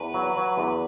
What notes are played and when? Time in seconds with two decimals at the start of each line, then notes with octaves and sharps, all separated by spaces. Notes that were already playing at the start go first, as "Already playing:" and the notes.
Already playing: E2 B4
0.14 F#3
0.36 F#3
0.57 E2